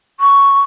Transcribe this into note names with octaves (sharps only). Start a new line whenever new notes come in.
C#6